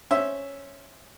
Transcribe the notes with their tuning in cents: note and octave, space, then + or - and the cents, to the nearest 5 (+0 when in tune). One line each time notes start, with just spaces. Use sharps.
C#4 +0 C5 +10 E5 +0